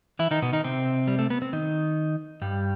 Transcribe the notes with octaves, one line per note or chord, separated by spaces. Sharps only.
E3 E4
D#3 D#4
B2 B3
D#3 D#4
C3 C4
G3
A3
B3
C4
D#3 D#4
G2 G3